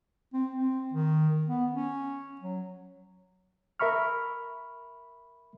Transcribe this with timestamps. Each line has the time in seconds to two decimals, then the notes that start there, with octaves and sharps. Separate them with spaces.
0.33 C4
0.55 C4
0.93 D#3
1.47 B3
1.72 C#4
2.41 F#3
3.80 A#4 E5 B5 C#6 F6